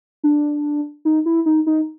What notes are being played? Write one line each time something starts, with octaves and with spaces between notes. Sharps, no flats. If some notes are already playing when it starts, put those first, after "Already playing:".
D4
D#4
E4
D#4
D#4